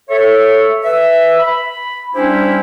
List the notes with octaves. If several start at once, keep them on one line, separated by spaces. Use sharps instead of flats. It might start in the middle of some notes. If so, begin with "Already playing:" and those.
A4 C#5 E5
B4 E5
B5
G3 C#4 D4 E4 G4 C5